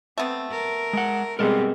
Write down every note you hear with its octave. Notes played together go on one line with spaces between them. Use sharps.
A3 B3 C4
A#4
G#3 F#5
B2 G3 G#3 C4 A4 A#4